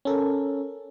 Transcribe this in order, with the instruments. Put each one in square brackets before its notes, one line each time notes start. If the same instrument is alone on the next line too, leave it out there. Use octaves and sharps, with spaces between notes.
[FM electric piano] C#4 A4 A#4